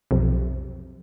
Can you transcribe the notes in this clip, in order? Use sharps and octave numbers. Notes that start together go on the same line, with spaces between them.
B1 F2 C3